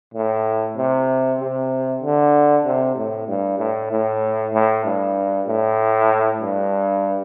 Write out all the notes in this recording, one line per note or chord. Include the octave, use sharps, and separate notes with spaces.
A2
C3
C3
D3
C3
A2
G2
A2
A2
A2
G2
A2
G2